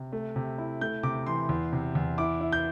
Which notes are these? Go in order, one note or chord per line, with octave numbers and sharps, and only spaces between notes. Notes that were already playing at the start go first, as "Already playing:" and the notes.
Already playing: C3
A3
C3
E4
A3 G6
C3 D6
E3 C6
E2
C3
E2
E4 D6
E4
G6